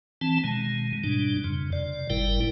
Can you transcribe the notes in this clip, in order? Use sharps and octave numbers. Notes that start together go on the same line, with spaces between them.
E3 C4 A5
B2 D#3 G#3
G#2 B2 G3 D4
F2 C#3
C3 D5
G1 A2 G3 E4 A#4 G5